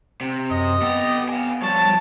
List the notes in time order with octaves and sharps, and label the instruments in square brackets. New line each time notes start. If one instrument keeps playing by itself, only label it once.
[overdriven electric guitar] C3
[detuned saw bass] F#2 [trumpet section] D#5
[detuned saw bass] B3 [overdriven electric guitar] G4 A4
[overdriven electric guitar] F5 G#5
[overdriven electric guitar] F3 C#5 [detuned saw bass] G3 [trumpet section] A5